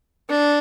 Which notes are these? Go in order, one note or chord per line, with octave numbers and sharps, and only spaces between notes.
D4